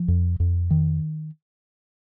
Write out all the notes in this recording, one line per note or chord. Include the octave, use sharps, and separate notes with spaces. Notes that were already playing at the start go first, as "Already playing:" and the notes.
Already playing: F3
F2
F2
D#3